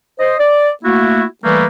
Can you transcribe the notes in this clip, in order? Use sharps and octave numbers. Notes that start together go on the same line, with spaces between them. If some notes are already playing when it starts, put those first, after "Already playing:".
C5 D#5
D5
A3 A#3 E4 F#4
E3 G3 A3 A#3 B4